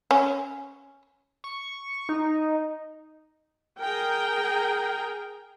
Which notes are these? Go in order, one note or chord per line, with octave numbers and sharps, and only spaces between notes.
C#4
C#6
D#4
G#4 A#4 G5